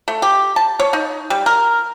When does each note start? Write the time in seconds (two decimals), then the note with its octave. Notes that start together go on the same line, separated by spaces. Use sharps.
0.08 A3
0.22 G4
0.56 A5
0.80 C#5
0.93 D#4
1.30 G3
1.46 A#4